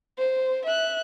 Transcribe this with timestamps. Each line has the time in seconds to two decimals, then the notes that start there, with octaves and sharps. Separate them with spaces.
0.18 C5
0.65 E5 F#6